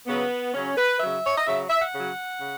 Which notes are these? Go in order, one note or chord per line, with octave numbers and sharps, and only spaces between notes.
C#3 F#3 B3
C#3 F#3 C#4
B4
C#3 F#3 E5
C#5
D#5
C#3 F#3 E5
E5
F#5
C#3 F#3
C#3